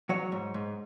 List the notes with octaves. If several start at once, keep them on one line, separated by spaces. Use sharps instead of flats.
F#3 C#5
G#2
G#2